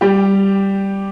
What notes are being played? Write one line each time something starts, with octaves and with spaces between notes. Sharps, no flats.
G3 G4